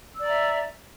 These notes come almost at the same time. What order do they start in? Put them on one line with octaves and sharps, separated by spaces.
E6 D5 A#5 E5